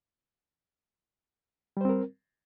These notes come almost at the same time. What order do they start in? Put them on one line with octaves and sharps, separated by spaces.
G3 C5 C4 A#4